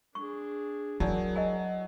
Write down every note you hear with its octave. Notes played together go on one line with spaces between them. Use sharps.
D4 G#4 C#6
F#3 E4 G#4 A#4 D5 G#5 A5
D#5 F#5 G#5